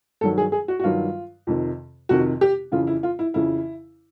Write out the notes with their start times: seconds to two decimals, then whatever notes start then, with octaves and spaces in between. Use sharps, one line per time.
0.21 G2 D#3 F#3 A4
0.38 G#4
0.52 G#4
0.68 F#4
0.80 F#4
0.84 G2 D#3 F#3 F4
1.47 F2 C3 D#3
2.09 F2 C3 D#3 F#4
2.41 G4
2.72 F2 C#3 E3 F4
2.87 E4
3.03 F4
3.19 E4
3.34 F2 C#3 E3 E4